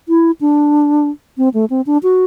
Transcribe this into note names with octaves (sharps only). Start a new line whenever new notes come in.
E4
D4
C4
A3
C4
D4
F#4